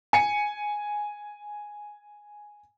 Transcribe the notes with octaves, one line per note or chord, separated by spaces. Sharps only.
G#5 C#7